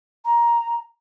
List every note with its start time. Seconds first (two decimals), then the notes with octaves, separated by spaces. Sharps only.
0.25 A#5